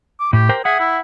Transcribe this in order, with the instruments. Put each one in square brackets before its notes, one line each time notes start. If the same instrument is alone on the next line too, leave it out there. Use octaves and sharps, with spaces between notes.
[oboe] D6
[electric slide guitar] A2 [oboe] G4
[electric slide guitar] A#4 C5 G5
[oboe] G#4 [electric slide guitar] E5 F#5
[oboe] E4